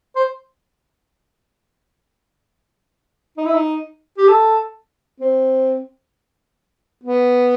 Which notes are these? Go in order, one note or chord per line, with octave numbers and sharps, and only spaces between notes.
C5
D#4
E4
D#4
G4
A4
C4
B3